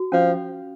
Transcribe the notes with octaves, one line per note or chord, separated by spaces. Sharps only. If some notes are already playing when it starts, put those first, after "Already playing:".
Already playing: F#4
F3 C#4